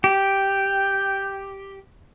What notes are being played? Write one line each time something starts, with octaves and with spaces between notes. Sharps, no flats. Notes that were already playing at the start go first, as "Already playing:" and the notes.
G4 G5